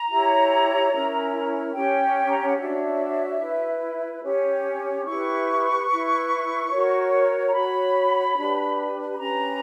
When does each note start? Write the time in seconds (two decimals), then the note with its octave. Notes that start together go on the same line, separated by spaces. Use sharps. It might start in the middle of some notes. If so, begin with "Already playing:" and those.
Already playing: A#5
0.08 E4 G4 C#5
0.91 C#4 E4 A#4
1.74 C#4 G4 C#5 G5
2.29 A#5
2.39 G5
2.47 F#5
2.57 D4 F#4 C#5 E5
3.40 E4 B4
4.22 C#4 G4 C#5
5.05 E4 G4 B4 C#6
5.89 E4 B4
6.70 F#4 A#4 C#5
7.47 A#5
7.53 F#4 C#5 B5
8.36 D4 G4 B4
9.15 B5
9.19 C#4 G4 B4 A#5